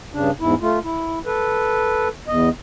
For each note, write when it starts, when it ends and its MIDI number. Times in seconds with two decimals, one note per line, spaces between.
0.14 0.31 43
0.14 0.31 49
0.14 0.31 62
0.40 0.55 40
0.40 0.55 44
0.40 0.55 64
0.61 0.79 57
0.61 0.79 65
0.84 1.19 64
1.26 2.08 69
1.26 2.08 71
2.28 2.49 40
2.28 2.49 75